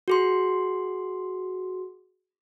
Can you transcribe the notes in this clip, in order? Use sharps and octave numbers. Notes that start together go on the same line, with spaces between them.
F#4 G#4 C6